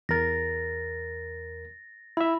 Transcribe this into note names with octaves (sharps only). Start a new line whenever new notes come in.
E2 A#4 A6 A#6
E4 E5 B5